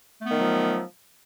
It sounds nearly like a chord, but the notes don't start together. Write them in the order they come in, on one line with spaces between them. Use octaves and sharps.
A3 B3 D#3 F#3 F3